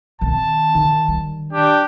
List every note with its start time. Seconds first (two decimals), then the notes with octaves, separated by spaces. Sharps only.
0.21 D#3 C4 A5
0.75 D#3 D#4
1.08 G3
1.53 D4 G4